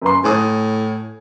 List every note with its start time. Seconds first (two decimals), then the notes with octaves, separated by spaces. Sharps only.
0.02 F#2 B4 C6
0.24 A2 G#5 D#6